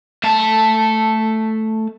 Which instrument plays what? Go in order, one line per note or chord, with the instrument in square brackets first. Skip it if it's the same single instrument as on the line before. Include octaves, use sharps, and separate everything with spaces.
[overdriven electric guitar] A3 A5